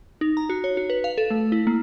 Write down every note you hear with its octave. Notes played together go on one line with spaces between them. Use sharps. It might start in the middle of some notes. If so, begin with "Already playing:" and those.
D#4
A#5
F#4
C#5
F#4
B4
F5
A4
A3
E4
A#3